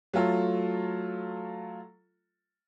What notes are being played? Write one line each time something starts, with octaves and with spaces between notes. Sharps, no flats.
F#3 A3 F4 A4